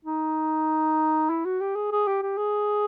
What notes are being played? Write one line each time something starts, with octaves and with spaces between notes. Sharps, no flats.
D#4
E4
F#4
G4
G#4
G#4
G4
G4
G#4